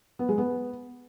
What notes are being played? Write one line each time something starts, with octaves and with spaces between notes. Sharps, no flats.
B3
G#3
B3